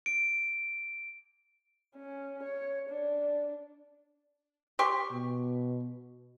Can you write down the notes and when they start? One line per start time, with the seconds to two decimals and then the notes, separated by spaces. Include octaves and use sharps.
0.06 D7
1.96 C#4
2.43 C#5
2.90 D4
4.79 G4 C6 C#6
5.11 B2